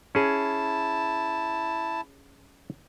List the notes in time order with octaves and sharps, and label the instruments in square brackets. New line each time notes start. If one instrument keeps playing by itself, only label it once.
[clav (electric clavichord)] C#4 G#4 [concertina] E4 A5